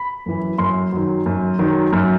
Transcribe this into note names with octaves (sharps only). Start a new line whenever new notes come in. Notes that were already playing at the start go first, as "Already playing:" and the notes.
Already playing: B5
F#2 E3
F#2 C6
D#3 F#3
F#2
D#3 F#3
F#2